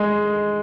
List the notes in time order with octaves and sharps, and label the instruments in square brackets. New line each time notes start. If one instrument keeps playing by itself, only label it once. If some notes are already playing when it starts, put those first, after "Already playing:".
Already playing: [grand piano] G#3